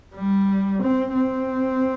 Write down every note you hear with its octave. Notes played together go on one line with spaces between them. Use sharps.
G3
C4
C4